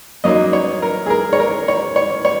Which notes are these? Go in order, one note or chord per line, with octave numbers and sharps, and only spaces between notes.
F#2 F#3 A#3 D#4 D#5
C#5
A#4
G#4
A#4
C#5
A#4
C#5
C#5
C#5